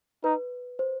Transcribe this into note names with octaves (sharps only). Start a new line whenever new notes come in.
D#4 B4
C5